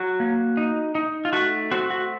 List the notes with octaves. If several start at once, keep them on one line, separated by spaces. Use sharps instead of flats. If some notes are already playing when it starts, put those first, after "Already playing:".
Already playing: F#3 F#4
A#3
D#4
D#4
F4
A3 F#4
C4 F#4
F#4